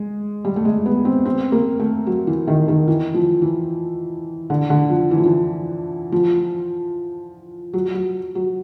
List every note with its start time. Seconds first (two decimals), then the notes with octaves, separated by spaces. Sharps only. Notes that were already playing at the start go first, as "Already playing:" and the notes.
Already playing: G#3
0.45 G3
0.56 A3
0.65 G#3
0.86 B3
1.05 C4
1.25 C4
1.52 A#3
1.79 A3
2.07 F#3
2.27 E3
2.47 D#3
2.68 D#3
2.88 E3
3.14 F3
3.42 E3
4.50 D3
4.70 D3
4.90 F3
5.11 E3
5.18 F3
5.26 E3
6.12 F3
7.73 F#3
7.94 F#3
8.35 F#3